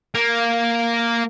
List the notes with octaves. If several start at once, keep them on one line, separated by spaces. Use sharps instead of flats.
A#3